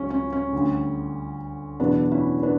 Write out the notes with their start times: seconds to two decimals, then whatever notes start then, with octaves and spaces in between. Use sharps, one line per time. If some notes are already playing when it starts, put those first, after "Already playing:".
Already playing: C#2 C#3 F#3 C#4
0.10 C#4
0.32 C#4
0.53 D2 D3 G3
1.80 E2 B2 F#3 B3 D4
2.11 C#4 E4
2.42 B3 D4